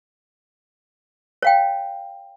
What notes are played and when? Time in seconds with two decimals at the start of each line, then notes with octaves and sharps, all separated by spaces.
1.42 C#5 F5 G5